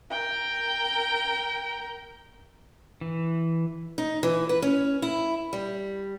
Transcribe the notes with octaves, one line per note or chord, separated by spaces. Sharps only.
A#4 G5
E3
D#4
E3
B4
C#4
E4
G3